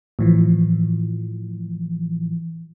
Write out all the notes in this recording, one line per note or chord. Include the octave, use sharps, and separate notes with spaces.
A2 E3 F3